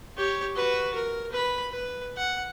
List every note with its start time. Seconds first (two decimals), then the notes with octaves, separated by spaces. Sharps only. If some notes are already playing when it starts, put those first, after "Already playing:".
0.16 G4 C#5
0.55 F#4 B4
0.94 A#4
1.32 B4 B5
1.72 B4
2.17 F#5